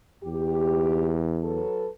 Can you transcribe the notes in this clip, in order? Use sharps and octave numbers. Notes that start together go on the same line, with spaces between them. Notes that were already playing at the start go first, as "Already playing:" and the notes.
E2 G4
F#3 A4 B4